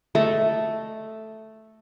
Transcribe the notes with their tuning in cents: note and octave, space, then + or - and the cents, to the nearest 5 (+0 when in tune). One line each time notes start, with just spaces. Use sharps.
A3 +0 D#5 -5